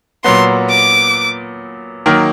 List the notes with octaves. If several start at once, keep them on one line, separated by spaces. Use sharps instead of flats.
A#2 F#3 B3 C6
D6
D#3 F#3 A#3